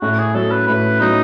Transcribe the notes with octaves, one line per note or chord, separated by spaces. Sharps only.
A2 F#4
G#4
F#3 C#4 A4
B4
A2 B4
F#3 C#4 D#4